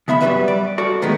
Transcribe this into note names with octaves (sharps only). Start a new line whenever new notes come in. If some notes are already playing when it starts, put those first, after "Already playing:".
C#3 B3 E5 B5
G2 F#3 G3 F#4 B4 E5
D5
F#4 A4 D5
A#2 D#3 G#3 A3 B3